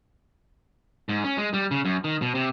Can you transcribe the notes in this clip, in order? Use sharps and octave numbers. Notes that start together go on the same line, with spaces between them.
G#2
C#4
G#3
G3
C#3
F#2
D#3
B2
C3